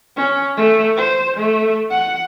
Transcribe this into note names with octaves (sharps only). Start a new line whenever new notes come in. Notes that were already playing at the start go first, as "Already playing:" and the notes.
C#4
A3
C5
A3
F#5